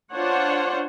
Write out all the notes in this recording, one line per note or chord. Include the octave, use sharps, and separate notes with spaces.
D4 F4 C5 C#5 F#5